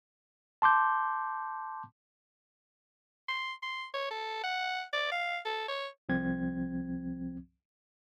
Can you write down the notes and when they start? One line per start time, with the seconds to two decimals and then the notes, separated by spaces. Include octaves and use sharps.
0.62 A5 C6 D6 G6
3.29 C6
3.63 C6
3.94 C#5
4.11 A4
4.44 F#5
4.93 D5
5.12 F5
5.45 A4
5.69 C#5
6.09 C2 F3 C4 G#6